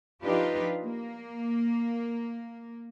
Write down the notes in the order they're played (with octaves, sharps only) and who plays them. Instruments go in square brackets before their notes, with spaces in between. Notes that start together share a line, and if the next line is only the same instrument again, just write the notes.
[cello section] F3 D4 D#4 F4 G4 B4
A#3